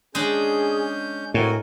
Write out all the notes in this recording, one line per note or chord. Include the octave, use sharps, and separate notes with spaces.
G#3 C#4 D4 G#4 G6
A2 C4 F#4 A#4 G#5